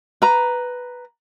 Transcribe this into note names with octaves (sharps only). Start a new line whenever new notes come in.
B4 A#5